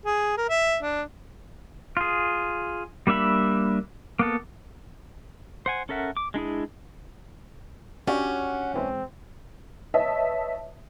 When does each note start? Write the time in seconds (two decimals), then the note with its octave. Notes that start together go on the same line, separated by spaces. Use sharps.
0.06 G#4
0.38 A#4
0.49 E5
0.83 D4
1.97 F4 G#4
3.07 G3 A#3 D4 E5 B5
4.19 A#3 B3 A4
5.66 C5 F#5 G#5
5.89 C#4 A4 A#4 E5 F#5
6.17 D6
6.34 G#3 D4 E4 G#4
8.07 C#4 D4 F#4 G4 F#5
8.74 B1 E3 G#3 C4
9.94 B4 C#5 D#5 E5 A5